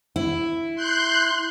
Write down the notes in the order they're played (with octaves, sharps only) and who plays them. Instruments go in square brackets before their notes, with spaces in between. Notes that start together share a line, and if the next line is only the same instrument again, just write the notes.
[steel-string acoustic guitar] E4
[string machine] C6 F#6 G6